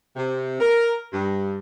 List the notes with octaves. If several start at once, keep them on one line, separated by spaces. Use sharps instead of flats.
C3
A#4
G2